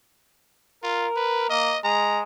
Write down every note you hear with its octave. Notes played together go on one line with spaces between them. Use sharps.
F4 A#4
B4
A#3 D#5
G#3 A#5